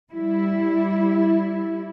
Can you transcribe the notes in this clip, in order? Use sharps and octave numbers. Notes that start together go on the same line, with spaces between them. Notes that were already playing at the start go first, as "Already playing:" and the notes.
G3 E4